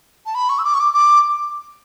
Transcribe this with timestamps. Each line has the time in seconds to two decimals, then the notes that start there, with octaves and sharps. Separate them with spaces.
0.26 A5
0.35 B5
0.49 C#6
0.59 E6
0.65 D6
0.74 C#6
0.80 D6
0.94 D6